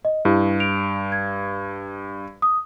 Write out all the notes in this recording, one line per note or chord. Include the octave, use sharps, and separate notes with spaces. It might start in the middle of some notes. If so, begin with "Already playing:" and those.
D#5
G2 E4 G4
D7 F7
G#6
D#6